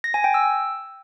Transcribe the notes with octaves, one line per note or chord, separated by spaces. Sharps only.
A#6
G#5
G5
E6